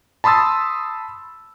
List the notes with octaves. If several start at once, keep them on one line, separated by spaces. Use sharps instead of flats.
A5 B5 C6 D#6 E6 A6